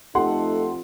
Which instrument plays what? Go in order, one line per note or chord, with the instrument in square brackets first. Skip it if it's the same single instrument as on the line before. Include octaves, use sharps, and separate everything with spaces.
[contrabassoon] F2 [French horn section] A3 D#4 A4 [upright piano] G4 F#5 C6